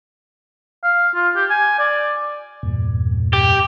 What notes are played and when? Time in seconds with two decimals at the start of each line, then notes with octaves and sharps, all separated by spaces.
0.83 F5
1.15 F4
1.36 G4
1.50 G#5
1.79 D5
2.63 E2 G2 A#2
3.33 G4